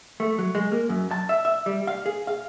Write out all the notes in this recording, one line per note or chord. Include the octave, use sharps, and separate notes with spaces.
A3
F#3
G#3
A#3
F#2
A5
E5
E5
G3
F5
G#4
F5